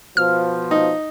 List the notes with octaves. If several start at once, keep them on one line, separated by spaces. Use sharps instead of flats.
B2 F3 F6
D#4